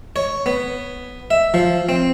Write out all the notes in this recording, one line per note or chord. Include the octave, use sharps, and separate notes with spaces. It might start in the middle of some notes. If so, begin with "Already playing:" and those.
C#5
B3
E5
F3
C4